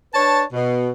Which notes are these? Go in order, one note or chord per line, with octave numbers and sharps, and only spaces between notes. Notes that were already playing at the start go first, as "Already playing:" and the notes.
D4 B4 C#5 A5
B2